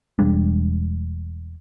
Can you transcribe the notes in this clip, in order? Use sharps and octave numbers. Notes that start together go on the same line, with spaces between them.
E1 G3 G#3 D4